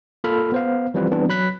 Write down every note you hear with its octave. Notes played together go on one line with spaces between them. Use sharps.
A#3 F4 A4 B5 F6
B3 C5 F5
E3 F3 G3 C4 F4 B4
E3 G3 B3 C4 D4
F#3 B5 F#6 B6